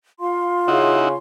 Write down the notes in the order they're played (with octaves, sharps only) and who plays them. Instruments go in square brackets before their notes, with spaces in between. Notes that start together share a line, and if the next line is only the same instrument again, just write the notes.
[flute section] F4 F5 C6
[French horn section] C#3 [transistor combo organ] D#4 E4 F#4